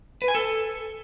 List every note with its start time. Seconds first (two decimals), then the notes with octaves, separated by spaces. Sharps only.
0.22 B4
0.28 G#5
0.35 A4